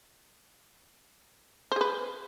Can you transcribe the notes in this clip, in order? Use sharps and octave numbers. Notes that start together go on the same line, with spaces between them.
G#4 B4 C5